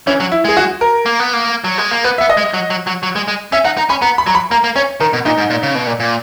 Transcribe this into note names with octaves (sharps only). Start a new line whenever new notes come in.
E3 C#4
F#3
E4
G#3 G#4
F#4
A#4
A#3
B3
A#3
F#3
G#3
A#3
B3 B4
B3 E5
D#5
G#3
F#3
F#3
F#3
F#3
G#3
G#3
C#4 E5
D#4 F#5
D#4 A#5
C#4 B5
B3 A#5
B5
F#3 A#5
B5
A#3 A#5
A#3
C#4 C#5
D#3 A#4
B2
A#2 D#4
G#2
A#2
C#3
B2
A#2
A#2